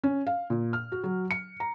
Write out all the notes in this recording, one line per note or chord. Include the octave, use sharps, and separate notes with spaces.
C#4
F5
A#2
F6
F#4
F#3
C#7
A#5